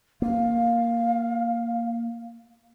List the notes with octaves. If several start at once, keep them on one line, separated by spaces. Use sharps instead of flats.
A#3 F5